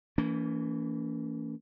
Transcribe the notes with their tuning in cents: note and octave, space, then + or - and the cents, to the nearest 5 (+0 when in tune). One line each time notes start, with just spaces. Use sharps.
E3 +0 A#3 -30 C#4 +40